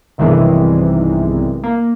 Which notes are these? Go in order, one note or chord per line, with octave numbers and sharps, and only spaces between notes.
B1 G2 C3 D#3 E3 G#3
A#3